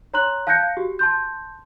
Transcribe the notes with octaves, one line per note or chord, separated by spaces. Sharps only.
C#5 A#5 C6 F#6 F#7
F5 A5 F#6 G6 A#6 C#7
F#4 G4
A5 C6 G6